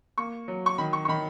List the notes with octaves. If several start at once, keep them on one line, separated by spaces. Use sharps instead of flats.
A#3 C#6
F#3
C#6
D#3 B5
C#6
C#6
D#3 B5